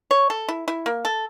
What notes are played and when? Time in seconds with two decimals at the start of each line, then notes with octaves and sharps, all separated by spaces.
0.11 C#5
0.30 A4
0.49 E4
0.68 E4
0.86 A#3
1.05 A4